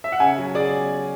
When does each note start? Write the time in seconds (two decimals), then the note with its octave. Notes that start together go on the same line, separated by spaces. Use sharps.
0.04 E5
0.12 F#5
0.20 C#3 G#5
0.38 F#3
0.55 G#4 D5